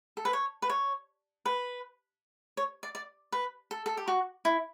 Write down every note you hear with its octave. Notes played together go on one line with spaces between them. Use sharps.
A4
B4
C#5
B4
C#5
B4
C#5
D5
D5
B4
A4
A4
G4
F#4
E4